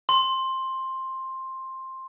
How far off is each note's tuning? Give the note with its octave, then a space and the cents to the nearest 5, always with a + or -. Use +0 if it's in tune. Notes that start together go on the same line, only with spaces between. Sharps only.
C6 +10